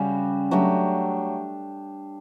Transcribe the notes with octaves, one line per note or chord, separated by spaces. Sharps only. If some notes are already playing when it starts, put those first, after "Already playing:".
Already playing: C#3 G3 C#4 F#4
F#3 A3 D4 G4